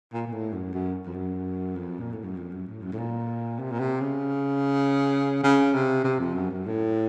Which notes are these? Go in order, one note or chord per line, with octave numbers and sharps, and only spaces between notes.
A#2
A#2
A2
F#2
F#2
F2
F#2
F2
A#2
A2
F#2
F2
F#2
A2
F#2
A2
A#2
C3
A#2
C3
C#3
C#3
C3
C3
F2
F#2
F#2
A2